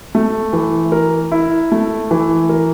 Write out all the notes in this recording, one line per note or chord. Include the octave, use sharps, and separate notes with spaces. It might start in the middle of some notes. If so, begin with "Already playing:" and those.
A3
E3
A#4
E4
A3
E3
A#4